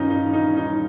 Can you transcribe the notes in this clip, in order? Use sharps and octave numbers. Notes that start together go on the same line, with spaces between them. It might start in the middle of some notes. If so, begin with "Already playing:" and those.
Already playing: G2 D#3 C#4 D#4 F4
D#4
D#4
D#4